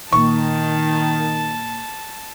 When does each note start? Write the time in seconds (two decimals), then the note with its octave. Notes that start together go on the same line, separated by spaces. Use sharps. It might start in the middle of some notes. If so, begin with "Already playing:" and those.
0.12 A#2 D#3 A#3 A5 C#6